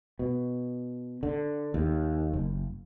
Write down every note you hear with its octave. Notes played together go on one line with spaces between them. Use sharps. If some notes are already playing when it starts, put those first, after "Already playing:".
B2
D3
D#2
F#1